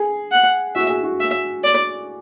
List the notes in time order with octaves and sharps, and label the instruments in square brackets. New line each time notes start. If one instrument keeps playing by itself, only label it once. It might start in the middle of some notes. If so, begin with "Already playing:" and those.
Already playing: [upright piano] G#4
[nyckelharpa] F#5
[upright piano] F#4 [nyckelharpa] E5
[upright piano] G#4
F#4
[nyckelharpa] E5
D5